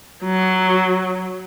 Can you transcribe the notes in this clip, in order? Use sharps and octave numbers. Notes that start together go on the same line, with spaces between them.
F#3